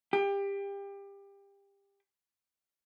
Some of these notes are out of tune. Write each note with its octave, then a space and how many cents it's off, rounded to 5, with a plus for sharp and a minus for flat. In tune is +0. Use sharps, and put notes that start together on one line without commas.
G4 +25